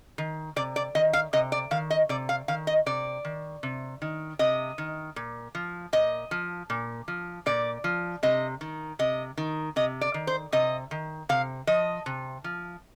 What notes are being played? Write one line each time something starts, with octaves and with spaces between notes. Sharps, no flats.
D#3
C3 D5
D5
D#3 D#5
F5
C3 D#5
D5
D#3 F5
D#5
C3 D5
F5
D#3 F5
D#5
C3 D5
D#3
C3
D#3
C3 D#5
D#3
A#2
F3
A#2 D#5
F3
A#2
F3
A#2 D5
F3
C3 D#5
D#3
C3 D#5
D#3
C3 D#5
D5
D#3
C5
C3 D#5
D#3
C3 F5
F3 D#5
C3
F3